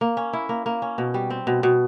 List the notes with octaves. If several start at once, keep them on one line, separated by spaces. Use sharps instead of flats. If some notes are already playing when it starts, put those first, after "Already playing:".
A#3
C#4
E4
A#3
A#3
C#4
B2
G3
C4
B2
B2